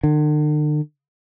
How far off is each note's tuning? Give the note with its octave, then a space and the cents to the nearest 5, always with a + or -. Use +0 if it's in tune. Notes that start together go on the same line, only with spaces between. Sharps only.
D3 +45